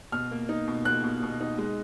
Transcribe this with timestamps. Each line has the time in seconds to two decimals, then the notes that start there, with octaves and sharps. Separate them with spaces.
0.12 B2 F6
0.31 A#3
0.49 D#4
0.67 B2
0.85 A#3 F#6
1.04 B2
1.23 B2
1.41 D#4
1.58 G#3